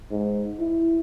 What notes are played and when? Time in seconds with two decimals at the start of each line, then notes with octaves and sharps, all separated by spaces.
0.11 G#2
0.60 E4